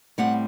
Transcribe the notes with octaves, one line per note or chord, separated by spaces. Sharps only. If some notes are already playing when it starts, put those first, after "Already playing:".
A2 G3 C4 F#5